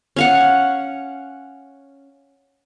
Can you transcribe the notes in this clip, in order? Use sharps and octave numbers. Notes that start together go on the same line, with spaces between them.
C#4 F5 F#5